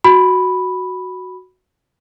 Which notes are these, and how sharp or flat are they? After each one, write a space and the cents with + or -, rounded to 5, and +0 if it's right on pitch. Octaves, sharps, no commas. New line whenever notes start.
F#4 +0 B5 +0